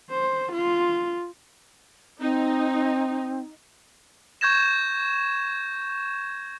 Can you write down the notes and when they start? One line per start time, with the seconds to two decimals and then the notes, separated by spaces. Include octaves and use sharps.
0.10 C5
0.53 F4
2.20 C4 D#4
4.41 C#6 G6 G#6 A#6 E7